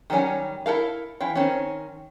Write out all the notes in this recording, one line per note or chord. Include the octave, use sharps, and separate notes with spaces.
D#3 F#3 G3 C#4 G#5
E4 A4 A#4 F5
E3 E4 F5 G5
D#3 C4 C#4